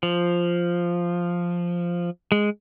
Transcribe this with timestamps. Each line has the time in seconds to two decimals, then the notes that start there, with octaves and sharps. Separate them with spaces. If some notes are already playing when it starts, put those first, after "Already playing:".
0.03 F3
2.32 G#3